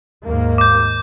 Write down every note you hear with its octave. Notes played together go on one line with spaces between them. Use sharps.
D#2 G#2 A#3
D6 G6